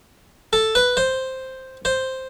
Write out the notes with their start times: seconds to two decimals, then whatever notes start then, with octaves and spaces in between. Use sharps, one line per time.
0.53 A4
0.75 B4
0.97 C5
1.85 C5